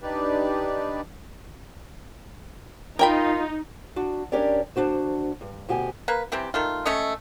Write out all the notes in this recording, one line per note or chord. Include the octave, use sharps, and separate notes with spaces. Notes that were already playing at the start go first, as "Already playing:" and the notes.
D4 D#4 G4 B4 D5
D#4 F4 A#4 G5 B5
D4 F#4
C#4 D4 G4 A#4 C#5 D5
D2 D#3 D4 F#4 C5
G2
D2 B2 F#4 G4 G#5
A#3 B4
C3 E3 C4 G4
D#3 A3 F4
A3 C#4 C#5 D#5